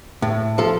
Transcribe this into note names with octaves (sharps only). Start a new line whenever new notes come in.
A2
F3 A4